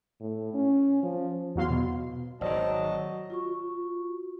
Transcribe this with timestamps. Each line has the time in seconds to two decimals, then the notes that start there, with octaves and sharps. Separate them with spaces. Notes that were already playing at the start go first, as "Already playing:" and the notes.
0.20 A2
0.54 C#4
1.03 F3
1.56 E2 F#3 F5 C6
1.70 B2
2.41 G#1 D#3 F#3 C5 D5 D#5 A5
3.30 F4 F#4 C#6